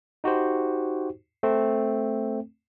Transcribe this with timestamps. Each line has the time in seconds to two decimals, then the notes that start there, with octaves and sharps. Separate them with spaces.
0.24 D#4 F#4 G4 C5
1.43 A3 C4